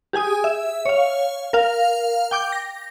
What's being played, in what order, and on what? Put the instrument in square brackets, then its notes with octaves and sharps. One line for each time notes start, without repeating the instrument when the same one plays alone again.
[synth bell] G4 G#4 G#5 D#6
E5
C#5 F5
A#4 F5
G5 D6 G6
A#6